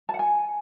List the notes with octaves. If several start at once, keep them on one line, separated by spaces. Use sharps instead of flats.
A5
F#5
G#5